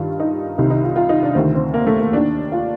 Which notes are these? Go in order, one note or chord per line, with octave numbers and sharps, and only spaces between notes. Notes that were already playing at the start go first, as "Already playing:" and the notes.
Already playing: G2 D#3 F4
D#4
C2 C3 D#3 D#4
D#4
F4
F4
D#4
D4
D2 C3 D#3 C4
C4
A#3
A3
A#3
D#2 D#3 D4
F4